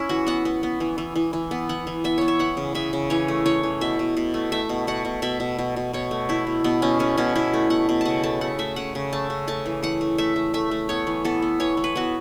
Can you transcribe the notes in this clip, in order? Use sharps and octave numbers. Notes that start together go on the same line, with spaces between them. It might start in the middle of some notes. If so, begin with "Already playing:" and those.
Already playing: C#4 E4
E3 F#4
B3 F#5
B3
B3
E3
E3
E3
E3
B3
E3 F#5
E3
B3 E5
B3 C#5
E5
E3 F#5
C#3
C#3 E5
C#3
E3 C#5
A3
E3 C#5
E3
B2 E5
B2
B2
A3
A3 E5
B2
B2 F#5
B2
B2 E5
B2
B2
B2
B2 C#5
A3
A3 E4
B2
B2 B3
B2 C#4
A3 C#4
B2 C#4
B2 E4
A3
B2 F#5
B2
C#3 F#5 A5
A3 A5
A3 F#5
A3 E5
C#3 F#5
C#3
A3 A5
C#3
A3 A5
E3
E3 F#5
A3
A3 E5
A3
A3 E5
A3
B3 C#5
E3
B3 A4
B3
E3 C#5
E3
B4
B3 F#4